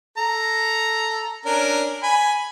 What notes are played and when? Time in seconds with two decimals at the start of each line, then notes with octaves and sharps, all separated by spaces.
0.18 A4 A#5
1.45 C#4 D4 A#4
2.03 G#5 B5